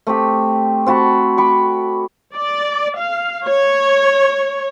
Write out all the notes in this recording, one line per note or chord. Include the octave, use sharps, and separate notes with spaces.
A3 C4 G4
C4 F#4 A5 B5
B5 C#6 D6
D5
F5
C#5